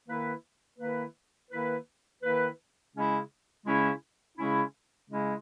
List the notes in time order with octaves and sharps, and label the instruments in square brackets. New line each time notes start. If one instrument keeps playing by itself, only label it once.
[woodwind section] D#3 A#3 E4 B4
D#3 A#3 E4 B4
D#3 A#3 E4 B4
D#3 A#3 E4 B4
C#3 G#3 C#4 E4
C#3 G#3 C#4 E4
C#3 G#3 C#4 E4
C#3 G#3 C#4 E4